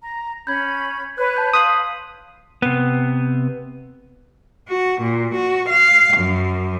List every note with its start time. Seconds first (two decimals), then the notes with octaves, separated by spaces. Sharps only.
0.03 A#5
0.47 C#4 B5 G6 G#6
1.18 B4 C#5 F#6
1.37 A5 G6
1.53 F5 C6 D#6 B6 F#7
2.62 C3 B3
4.68 F#4
5.01 A#2
5.35 F#4
5.69 F5
6.18 F#2